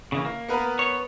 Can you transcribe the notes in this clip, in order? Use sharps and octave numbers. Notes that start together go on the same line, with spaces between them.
C#3 E3 A#3
A#3
B3 A#4 B4
C#5